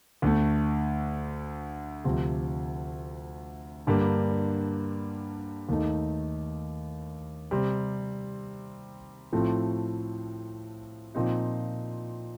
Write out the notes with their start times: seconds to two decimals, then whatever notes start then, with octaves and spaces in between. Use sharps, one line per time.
0.22 D2 D3 A3
2.04 D2 C3 F3 C4 G4
3.87 G2 D3 G3 A#3
5.69 D#2 D#3 A3 D#4
7.51 C3 G3 C4
9.32 A2 F3 A3 C4 F4
11.15 A#2 F3 C4 D#4